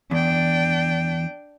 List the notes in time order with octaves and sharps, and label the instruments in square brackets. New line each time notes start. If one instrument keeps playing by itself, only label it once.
[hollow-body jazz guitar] E2 [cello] D4 G5